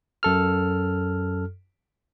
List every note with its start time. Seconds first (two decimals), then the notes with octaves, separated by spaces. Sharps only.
0.23 F#2 A4 F6